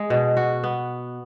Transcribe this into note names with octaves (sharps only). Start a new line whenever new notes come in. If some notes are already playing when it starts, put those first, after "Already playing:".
Already playing: G#3
B2
F#4
B3